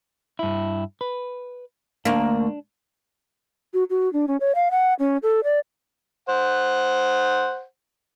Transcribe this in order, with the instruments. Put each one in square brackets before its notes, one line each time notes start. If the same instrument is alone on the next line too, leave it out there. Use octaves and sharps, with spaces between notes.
[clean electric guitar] G2 E4
B4
[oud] D2 A#3 [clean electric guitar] D4
[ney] F#4
F#4
D4
C#4
C#5
F5
F#5
C#4
A4
D5
[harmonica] C5 F#5